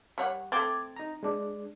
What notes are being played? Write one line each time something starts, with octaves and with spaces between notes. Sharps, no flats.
G3 C#5 F#5
A3 C4 D6 G#6 A6
D#4 A#5
G#3 D4